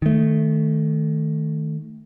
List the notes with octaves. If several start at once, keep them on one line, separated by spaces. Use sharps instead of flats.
D#3 A3